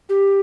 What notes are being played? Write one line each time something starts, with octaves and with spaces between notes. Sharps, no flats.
G4